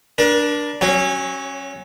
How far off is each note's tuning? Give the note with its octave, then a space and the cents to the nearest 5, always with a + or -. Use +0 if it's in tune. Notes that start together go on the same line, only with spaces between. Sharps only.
D4 +0 A#4 +40
F#3 +10 C#4 -20